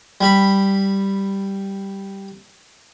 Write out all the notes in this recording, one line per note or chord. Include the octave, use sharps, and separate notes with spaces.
G3 B5